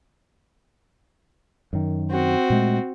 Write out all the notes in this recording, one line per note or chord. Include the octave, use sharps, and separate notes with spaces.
F#2 D#3
C4 F#4
A#2 G#3 A3